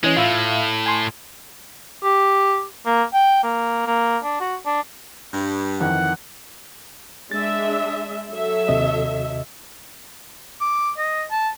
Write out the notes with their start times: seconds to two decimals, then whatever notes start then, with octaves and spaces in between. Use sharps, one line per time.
0.04 E3 G#3 C#4
0.16 A2 F4 E5 F5
0.86 G#5 C6
2.03 G4
2.86 A#3
3.13 G5
3.43 A#3
3.86 A#3
4.23 D4
4.40 F#4
4.66 D4
5.33 G2
5.80 F2 D#3 E3 F#5
7.31 G#3 D4 E5 A6
8.31 F#3 A4 E5
8.68 D#2 C3 D#5
10.61 D6
10.98 D#5
11.31 A5